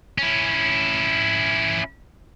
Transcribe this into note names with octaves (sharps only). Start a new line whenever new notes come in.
C#4 E4